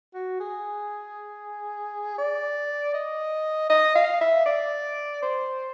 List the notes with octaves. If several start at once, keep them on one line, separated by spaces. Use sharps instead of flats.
F#4
G#4
D5
D#5
D#5
F5
E5
D5
C5